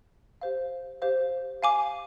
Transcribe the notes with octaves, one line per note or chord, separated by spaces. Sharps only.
G4 C5 F5
G4 C5 F5
F5 G#5 D6